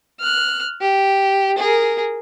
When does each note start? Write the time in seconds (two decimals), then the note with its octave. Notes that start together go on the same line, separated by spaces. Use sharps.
0.20 F6 F#6
0.81 G4
1.58 G#4 A#4